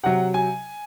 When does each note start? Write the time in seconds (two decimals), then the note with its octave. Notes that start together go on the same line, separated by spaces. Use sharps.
0.03 C3 F#3 F#5
0.34 G#5